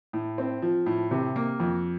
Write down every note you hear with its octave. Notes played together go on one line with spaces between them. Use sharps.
A2
C4
F3
A2
C3
A#3
F2